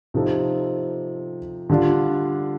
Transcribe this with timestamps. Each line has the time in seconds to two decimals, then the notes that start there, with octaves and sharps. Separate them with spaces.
0.14 C3 F3 C4 D#4 A4
1.70 D3 G3 D4 F4